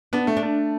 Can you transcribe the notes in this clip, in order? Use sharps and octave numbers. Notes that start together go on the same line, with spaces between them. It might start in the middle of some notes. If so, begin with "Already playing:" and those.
B3 D4
A3
D4
A3